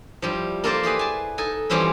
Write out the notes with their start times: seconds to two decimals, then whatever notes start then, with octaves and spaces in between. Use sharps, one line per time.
0.22 F3 G3 E4
0.64 A#3 F4 A4 A#4 C5 D5
0.83 E4 G4 G#4 B4
0.99 G#5 A5
1.38 D#4 A4 G#5
1.70 E3 F3 G3 C4 C#4 E4